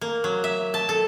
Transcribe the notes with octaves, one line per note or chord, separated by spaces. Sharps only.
A#3
F#3
E5
A5
A4